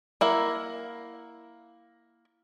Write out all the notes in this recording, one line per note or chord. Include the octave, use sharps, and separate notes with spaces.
A#3 E4 F#5